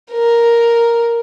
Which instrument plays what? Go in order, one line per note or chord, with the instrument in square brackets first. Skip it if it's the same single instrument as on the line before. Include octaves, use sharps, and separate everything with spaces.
[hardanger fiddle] A#4